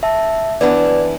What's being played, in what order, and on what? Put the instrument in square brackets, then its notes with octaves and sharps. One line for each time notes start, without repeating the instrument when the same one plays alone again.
[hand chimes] E5 A5
[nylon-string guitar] E3 B3 D4 [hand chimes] D5